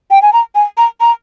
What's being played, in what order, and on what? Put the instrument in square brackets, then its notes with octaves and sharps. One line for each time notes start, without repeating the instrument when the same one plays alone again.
[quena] G5
G#5
A#5
G#5
A#5
A#5